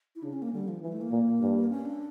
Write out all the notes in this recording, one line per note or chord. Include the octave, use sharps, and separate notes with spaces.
E4
C#3 D4
C#4
A#3
D3 G3
F3
E3 F3
G3
A3
A#3
A#2
G2
C#4
D4